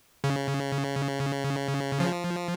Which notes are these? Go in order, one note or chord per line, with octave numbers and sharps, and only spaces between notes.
C#3
F3